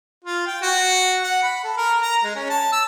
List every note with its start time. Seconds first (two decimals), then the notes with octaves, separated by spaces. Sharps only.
0.24 F4
0.46 G5
0.62 F#4
1.24 F#5
1.43 B5
1.64 A4
1.77 A#4
2.02 A#5
2.24 G#3
2.35 C#4
2.50 A5
2.72 E6